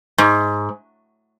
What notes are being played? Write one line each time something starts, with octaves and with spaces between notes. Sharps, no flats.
G#2